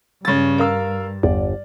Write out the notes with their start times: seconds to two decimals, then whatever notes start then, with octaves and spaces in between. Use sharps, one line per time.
0.25 G2 C#3 A6
0.58 A#4 F5 E6
1.23 G1 E2 D5